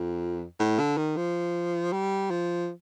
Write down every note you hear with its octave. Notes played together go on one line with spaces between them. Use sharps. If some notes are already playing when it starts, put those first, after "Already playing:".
Already playing: F2
A2
D3
D#3
F3
G3
F3